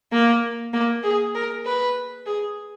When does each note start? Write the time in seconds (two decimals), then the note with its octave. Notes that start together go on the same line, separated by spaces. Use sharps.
0.13 A#3
0.73 A#3
1.04 G#4
1.35 A#4
1.66 B4
2.26 G#4